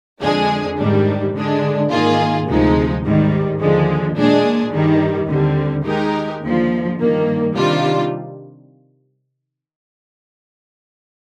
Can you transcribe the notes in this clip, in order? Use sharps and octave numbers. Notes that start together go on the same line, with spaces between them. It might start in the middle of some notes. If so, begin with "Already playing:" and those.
F2 D3 G#3 D4 G#4
G#2 D#3 G3 D4
D3 G#3 D4
G#2 D#3 A#3 F4 G#4
D2 C3 F3 G#3 D#4
G#2 D#3 G3
D#2 D3 F3 G#3
A#2 G#3 D4 G#4
G2 D#3 G3
D#2 D3 G3 C4
D#3 G#3 D#4 G4 A#4
D#2 D3 F3
G2 D#3 A#3
C3 D#3 G3 D4 F4